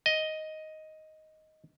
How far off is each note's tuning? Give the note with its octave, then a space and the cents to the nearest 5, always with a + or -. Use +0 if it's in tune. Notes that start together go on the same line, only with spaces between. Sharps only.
D#5 +5